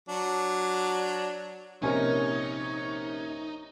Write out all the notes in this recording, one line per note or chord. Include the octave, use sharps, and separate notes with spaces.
F#3 D4
A#1 C3 C#4 D#4 A#4 C#5 G#5